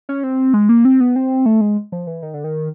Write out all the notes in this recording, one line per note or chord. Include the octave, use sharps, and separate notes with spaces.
C#4
C4
G#3
A#3
C4
B3
C4
A3
G#3
F3
E3
D#3
D3
D#3